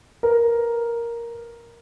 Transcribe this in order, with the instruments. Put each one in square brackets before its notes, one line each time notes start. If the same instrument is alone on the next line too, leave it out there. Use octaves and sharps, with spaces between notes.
[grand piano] A#4 B4